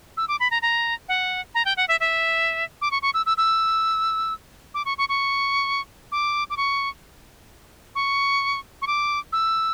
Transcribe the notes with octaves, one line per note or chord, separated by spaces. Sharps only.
E6
D6
B5
A#5
A#5
F#5
A#5
G5
F#5
E5
E5
D6
C#6
C#6
E6
E6
E6
D6
C#6
C#6
C#6
D6
D6
C#6
C#6
C#6
D6
E6